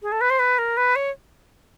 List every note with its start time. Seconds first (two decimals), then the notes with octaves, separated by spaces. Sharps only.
0.02 G#4
0.12 A4
0.21 B4
0.30 C5
0.39 B4
0.58 A#4
0.77 B4
0.96 C#5